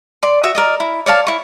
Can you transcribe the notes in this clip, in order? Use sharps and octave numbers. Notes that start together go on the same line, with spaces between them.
D5 C6
F#4 E5 D#6
A#4 D5 D#5
E4
C#5 D5 F5 A5
E4 C#6